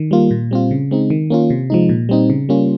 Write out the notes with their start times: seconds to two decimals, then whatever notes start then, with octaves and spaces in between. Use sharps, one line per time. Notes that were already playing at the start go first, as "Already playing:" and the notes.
Already playing: D#3
0.11 G3 A#3 F4
0.31 A#2
0.51 G3 C4 F4
0.71 C#3
0.91 G#3 C4 D#4
1.10 D#3
1.30 A#3 C#4 F4
1.50 C3
1.70 F3 G#3 D#4
1.89 A#2
2.09 G3 C4 D#4
2.30 C#3
2.49 G3 A#3 C#4 F4